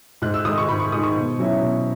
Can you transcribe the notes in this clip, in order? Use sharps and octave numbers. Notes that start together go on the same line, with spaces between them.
G#2 F#6
E6
D#3 G#3 D#4 D#6
C#6
G#2 B5
C#6
D#3 G#3 D#4 D#6
C#6
B2
F#3 C#4 E4
B2